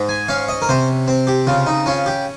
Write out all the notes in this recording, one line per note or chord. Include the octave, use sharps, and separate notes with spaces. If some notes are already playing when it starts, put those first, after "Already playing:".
Already playing: G#2
G#5
C#4 F5
D#5
A#4
C3 C5
C4
G4
C#3 F4
D#4
C#4 F4
G4